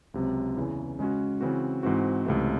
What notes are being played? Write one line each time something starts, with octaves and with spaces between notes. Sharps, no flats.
C#2 C3 F#3 C4
E2 C#3 E3
C#3 G#3 C#4 F#4
C#3 E3 C4 F#4
G#2 E3 C4 F#4
C#2 C3 E3 A3